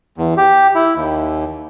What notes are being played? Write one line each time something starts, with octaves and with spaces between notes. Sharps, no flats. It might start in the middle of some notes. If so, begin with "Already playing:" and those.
E2
G4
E4
D#2